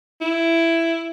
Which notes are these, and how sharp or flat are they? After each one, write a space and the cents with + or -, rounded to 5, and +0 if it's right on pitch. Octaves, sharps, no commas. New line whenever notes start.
E4 +10